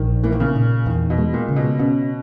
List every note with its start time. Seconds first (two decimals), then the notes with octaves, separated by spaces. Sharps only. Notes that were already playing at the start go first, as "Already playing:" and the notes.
Already playing: A#1 D#3
0.23 E3 A#3
0.32 D#3
0.40 C#3
0.56 A#2
0.86 E2 D#3
1.10 B2
1.18 G#3
1.34 A#2
1.48 C#3
1.56 B2
1.79 B2 C#4